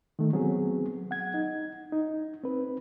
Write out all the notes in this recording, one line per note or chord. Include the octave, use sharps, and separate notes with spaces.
D#3 A3
F#3 B3 C4 G#4
F#5 G#6
D#4
D#4
C4 B4